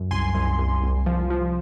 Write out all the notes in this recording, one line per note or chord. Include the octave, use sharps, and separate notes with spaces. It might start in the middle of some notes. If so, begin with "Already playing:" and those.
Already playing: F#2
C2 G#5 C6
C2
C2
C2
F3
F3